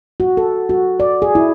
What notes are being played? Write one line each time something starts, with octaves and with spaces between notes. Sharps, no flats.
F#4
A4
F#4
D5
G#4
E4